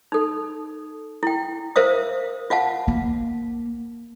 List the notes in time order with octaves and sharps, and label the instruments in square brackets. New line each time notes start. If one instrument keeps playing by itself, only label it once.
[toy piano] D#4 A4
E4 G5
A#4 C5 E5 F5 D#6
F4 F5 F#5 A5
[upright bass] A#3